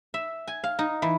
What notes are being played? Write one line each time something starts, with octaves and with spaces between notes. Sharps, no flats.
E5
G#5
F5
D#4
E3